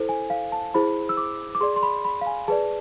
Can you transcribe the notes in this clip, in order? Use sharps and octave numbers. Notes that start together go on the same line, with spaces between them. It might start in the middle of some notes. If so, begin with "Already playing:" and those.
Already playing: E4 A4 C5
G#5
F5
A5
E4 G#4 C5 B5
E6
D6
D6
G#4 D5 C6
C6
B5
B5
F5
G#5
G#4 B4 D5 A5